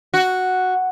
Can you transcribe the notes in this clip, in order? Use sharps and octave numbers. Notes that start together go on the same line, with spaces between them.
F#4